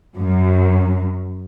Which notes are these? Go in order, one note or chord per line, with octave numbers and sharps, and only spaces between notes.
F#2